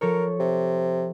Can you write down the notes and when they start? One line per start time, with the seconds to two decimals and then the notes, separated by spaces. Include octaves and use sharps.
0.01 F3 A4 A#4 C#5
0.40 C3